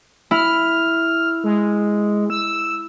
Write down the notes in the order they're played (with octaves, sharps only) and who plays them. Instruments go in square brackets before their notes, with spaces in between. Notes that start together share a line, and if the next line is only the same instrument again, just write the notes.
[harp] E4 [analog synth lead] F6
[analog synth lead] G#3
E6